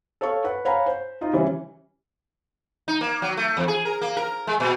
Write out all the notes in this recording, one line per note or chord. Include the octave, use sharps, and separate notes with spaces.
A4 C#5 F5 C#6
B4 F#5
C#5 F5 F#5 G#5 A#5 B5
C5
D#4 F4 D#5
C#3 E3 G3 C#4
D#4
A#3
F#3
A3
E2
G#4
A#4
A#3
A#4
G#3
A#2